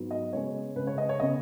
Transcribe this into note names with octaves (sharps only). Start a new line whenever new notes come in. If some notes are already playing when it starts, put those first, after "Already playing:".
Already playing: G#2 F#3 B3
D#5
C#3 G#3 B3 C#5
C#3 G#3 C#4 B4
C#5
D#5
C#5
C#3 B3 D#5